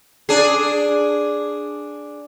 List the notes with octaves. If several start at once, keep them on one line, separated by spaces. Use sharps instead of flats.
D4 G#4